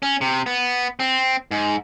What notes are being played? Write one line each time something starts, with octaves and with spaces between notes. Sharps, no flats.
C#4
C3
B3
C4
G#2